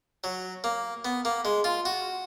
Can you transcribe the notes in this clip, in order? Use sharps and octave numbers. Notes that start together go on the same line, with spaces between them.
F#3
A#3
B3
A#3
G#3
F4
F#4